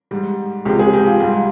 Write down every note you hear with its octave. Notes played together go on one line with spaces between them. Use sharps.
G#2 G3
C#2 C3 F3 G#3 G4
G#4
G4
F4
G#2 G3 F4